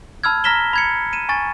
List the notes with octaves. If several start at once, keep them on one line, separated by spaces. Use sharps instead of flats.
A5 B5 E6 F6 G#6
A#5 F6 A#6 B6 E7 G7
B5 G#6 C#7
D#7 E7
G#5 C#6 A6